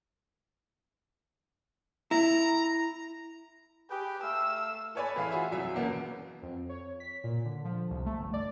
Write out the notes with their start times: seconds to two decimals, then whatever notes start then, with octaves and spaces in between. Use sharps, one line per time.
2.11 E4 A#5
3.90 G4 G#4 B4 G5
4.23 A3 F5 E6
4.95 A4 B4 C#5 D5 G#5 B5
5.16 A2 E3 G#4 F5 B5
5.31 F4 F#4 G#4 E5
5.52 C2 F#3 E5
5.75 E2 B2 A#3 B3 C#4
6.42 F2
6.69 C#5
7.00 B6
7.24 A#2
7.45 D3
7.65 F3
7.90 C2
8.06 A3
8.18 G1
8.33 D5